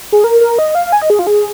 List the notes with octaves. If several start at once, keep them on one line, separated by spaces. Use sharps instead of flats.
G#4
A#4
A#4
D#5
F5
G#5
D#5
G#4
F4
G#4